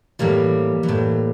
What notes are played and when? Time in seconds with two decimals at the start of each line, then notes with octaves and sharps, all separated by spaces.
0.19 A2 E3 G3 A#3
0.83 E3
0.88 A2